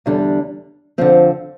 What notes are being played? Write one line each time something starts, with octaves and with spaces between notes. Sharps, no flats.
E2 D3 G3 D4
F2 D3 F3 C4